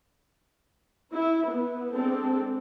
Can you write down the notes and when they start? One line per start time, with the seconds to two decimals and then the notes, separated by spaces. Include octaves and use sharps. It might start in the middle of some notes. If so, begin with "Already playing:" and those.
1.12 E4
1.47 B3
1.94 G#3 C4 D4 A4